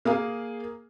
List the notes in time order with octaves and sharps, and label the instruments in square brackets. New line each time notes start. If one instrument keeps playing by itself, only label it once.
[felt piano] A#3 G#4 F5